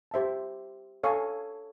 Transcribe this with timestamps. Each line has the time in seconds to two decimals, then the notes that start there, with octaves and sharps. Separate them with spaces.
0.11 G4 C5 E5 A5
1.03 A4 C#5 F5 G#5 C#6